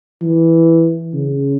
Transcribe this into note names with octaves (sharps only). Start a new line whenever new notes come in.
E3
C#3